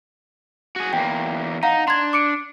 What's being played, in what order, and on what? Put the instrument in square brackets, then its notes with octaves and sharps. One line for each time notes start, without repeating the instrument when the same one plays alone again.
[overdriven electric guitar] F#4 G#4
[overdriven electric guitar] E2 A#3 [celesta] G5
[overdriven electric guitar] D#4 [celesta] F5 F#5 A#5
[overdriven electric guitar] D4 [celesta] C6 G#6
[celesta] D6 C#7 D7